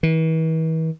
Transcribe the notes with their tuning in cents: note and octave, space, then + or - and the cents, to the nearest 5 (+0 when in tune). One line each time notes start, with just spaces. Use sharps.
E3 -40